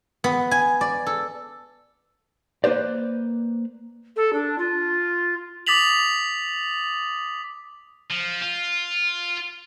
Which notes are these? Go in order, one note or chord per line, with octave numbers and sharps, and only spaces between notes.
B3
G#5
D5
A4
A#3 B4 C5 D5
A4
D4
F4
D6 D#6 A6 B6 F7 F#7
F3
F4